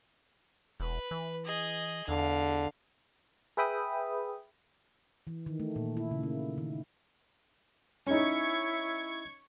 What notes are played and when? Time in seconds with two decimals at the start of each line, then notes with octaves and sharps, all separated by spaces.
0.80 E1 B4
1.11 E3
1.45 G#4 D#5
2.08 E2 D3 F5
3.57 G#4 B4 E5 G5 B5 D#6
5.27 E3
5.46 D#3
5.60 A3
5.76 A#2
5.97 E4
6.11 C#3
6.23 A#3
6.58 D#3
8.07 C#4 D#4 E4 C#6 G#6